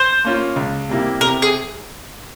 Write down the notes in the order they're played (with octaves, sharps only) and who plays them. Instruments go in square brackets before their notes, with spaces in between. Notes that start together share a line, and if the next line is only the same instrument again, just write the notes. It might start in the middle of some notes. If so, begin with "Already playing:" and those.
Already playing: [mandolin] C5
[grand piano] A#3 C#4 F4
C#2
C3 G3 A#3 E4
[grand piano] C3 [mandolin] A#4
[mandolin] G#4